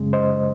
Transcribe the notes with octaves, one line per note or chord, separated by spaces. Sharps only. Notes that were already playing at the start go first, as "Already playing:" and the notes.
Already playing: F#2 C#3 G#3
C5 D#5